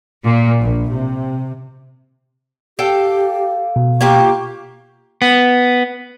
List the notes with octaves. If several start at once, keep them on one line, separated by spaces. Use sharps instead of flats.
A#2
A#1
C3
G4 A4 F5 G5
B2
A#3 F4 G4 C#6
B3